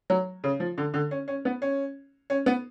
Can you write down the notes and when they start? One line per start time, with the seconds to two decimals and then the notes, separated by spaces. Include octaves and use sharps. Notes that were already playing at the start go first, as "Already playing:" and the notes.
0.10 F#3
0.44 C#3
0.60 F3
0.78 D3
0.94 D3
1.11 C#4
1.28 C#4
1.45 B3
1.62 C#4
2.30 C#4
2.46 B3